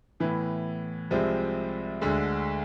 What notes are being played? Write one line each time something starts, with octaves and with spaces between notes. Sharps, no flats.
A2 E3 B3
C2 C3 F3 G#3 C4
D2 D3 G#3